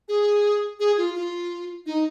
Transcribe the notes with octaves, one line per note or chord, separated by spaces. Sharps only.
G#4
G#4
F4
F4
D#4